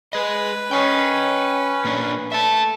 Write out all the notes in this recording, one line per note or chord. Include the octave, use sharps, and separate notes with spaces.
G#4 B4 D#5
C#4 D#5 G5
A#2 A#3 D4
A4 E5 A5